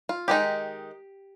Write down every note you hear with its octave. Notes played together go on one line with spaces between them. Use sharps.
F4
D#3 G#3 D#4 G4